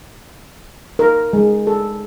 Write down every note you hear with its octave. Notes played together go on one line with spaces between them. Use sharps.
A#4
G#3
A4